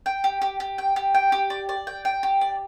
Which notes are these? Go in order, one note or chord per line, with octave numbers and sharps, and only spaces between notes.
G5
G4
G4
G4
G5
G4
G5
G4
D5
D5
G5
G5
G4
D5